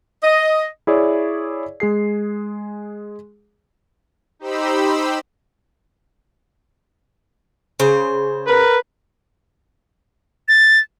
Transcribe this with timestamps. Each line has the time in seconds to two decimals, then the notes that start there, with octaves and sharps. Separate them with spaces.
0.24 D#5
0.87 E4 G#4 C#5 D5 E5
1.80 G#3 G#4 C7
4.39 D#4 G4 C5 B5 E6
7.80 C#3 C5
8.47 A#4 B4
10.48 A6